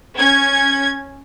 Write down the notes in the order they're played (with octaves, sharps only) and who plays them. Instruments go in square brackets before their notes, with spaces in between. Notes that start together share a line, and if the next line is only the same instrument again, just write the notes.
[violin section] C#4 G#6